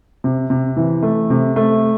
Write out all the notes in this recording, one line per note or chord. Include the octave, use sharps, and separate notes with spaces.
C3
C3
E3
A3
C3
A3